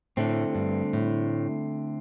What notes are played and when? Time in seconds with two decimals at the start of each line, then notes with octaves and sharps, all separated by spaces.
0.17 A2 D3 A3 C4
0.55 G2
0.93 A2